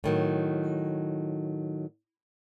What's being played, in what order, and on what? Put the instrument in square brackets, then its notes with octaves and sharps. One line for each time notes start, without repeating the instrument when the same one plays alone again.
[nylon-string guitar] A2 D#3 F#3